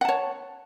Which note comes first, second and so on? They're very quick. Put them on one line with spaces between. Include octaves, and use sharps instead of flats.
F#5 A5 C#5